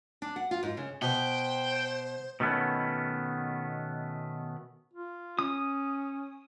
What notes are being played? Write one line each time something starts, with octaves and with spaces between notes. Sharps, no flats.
D4
F#5
F4
G#2
C#3
B2 C5 G5
B2 D#3 A3 B3 C#4
F4
C#4 D#6